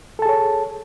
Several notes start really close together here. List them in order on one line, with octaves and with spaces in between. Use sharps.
A4 A5 G#4 C#5